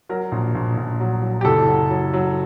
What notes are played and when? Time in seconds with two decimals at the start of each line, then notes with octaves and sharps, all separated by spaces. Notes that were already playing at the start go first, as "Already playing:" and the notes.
0.09 F#3 A#4
0.32 A#1
0.55 A#1
0.77 A#1
1.00 F#3
1.22 F#3
1.41 G4
1.45 F#1 A4
1.67 F#3
1.90 F#3
2.13 F#3